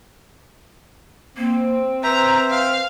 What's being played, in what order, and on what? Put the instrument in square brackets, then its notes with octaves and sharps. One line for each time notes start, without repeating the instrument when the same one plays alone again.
[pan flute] A#3 [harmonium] C4
[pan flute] B4 [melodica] C5 E5 [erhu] A#5
[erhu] F5